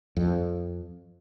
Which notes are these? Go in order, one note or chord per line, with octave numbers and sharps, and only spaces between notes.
F2